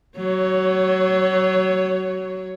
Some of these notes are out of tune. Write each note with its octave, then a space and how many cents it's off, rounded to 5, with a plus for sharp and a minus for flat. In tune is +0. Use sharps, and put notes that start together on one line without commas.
F#3 +25 C#5 +0